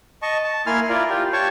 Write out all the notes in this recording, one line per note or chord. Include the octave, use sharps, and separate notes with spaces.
D#5 A5 C#6
A5
A#3 E4 G#5 C6 F6
E4 F4 A#4 D5
F4 G4
G4 C#5 A5 C#6